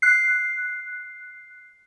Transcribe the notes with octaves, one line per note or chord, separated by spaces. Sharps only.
F#6 C7